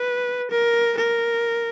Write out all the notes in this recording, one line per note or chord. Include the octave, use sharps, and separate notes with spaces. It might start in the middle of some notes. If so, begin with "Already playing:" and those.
Already playing: B4
A#4
A#4